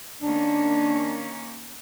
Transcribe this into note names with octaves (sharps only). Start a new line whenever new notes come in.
D#3 A#3 C#4 D4